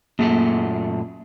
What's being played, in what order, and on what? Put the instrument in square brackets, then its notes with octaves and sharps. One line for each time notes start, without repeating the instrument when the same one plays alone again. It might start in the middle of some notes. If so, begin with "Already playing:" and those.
[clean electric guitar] F#2 A#2 A3 [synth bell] A#3